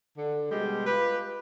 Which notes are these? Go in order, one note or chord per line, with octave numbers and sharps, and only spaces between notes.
D3
B2 G3 G#3
F4 G4 B4